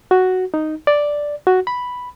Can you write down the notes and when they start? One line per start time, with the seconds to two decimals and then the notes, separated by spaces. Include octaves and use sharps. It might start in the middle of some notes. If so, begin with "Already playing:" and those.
0.11 F#4
0.54 D#4
0.87 D5
1.47 F#4
1.67 B5